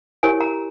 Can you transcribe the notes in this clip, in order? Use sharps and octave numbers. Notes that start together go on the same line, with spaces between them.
E4 G4 A#4 C#5 G#5
A#5